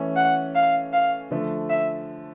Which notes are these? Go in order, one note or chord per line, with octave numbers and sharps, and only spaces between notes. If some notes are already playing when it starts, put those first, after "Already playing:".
Already playing: E3 A3 C#4
F#5
F5
F5
D3 F3 A3
E5